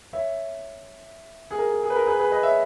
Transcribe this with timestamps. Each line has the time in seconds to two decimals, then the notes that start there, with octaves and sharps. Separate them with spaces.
0.13 C#5 E5
1.51 G#4
1.58 A#4
1.71 G#4
1.83 G#4
1.90 B4
1.96 A#4
2.07 G#4 B4
2.19 G#4 B4
2.31 B4 D#5
2.43 C#5 E5